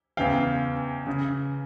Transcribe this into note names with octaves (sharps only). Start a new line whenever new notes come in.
E2 C#3 E3 F5 G5
C#3